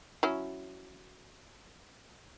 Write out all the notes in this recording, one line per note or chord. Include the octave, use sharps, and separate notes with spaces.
F#3 C#4 E4